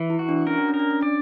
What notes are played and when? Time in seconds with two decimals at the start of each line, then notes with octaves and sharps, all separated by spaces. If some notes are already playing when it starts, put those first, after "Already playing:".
Already playing: E3
0.10 E4
0.19 F#4
0.29 D4
0.47 C#4 A#4
0.58 D4
0.69 C#4
0.74 A#4
0.79 D4
0.90 C#4
1.01 D4 D5